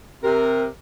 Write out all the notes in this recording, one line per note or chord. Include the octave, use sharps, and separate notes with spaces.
C3 A#4